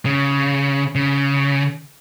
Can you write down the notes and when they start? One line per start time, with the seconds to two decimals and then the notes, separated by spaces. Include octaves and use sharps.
0.06 C#3
0.95 C#3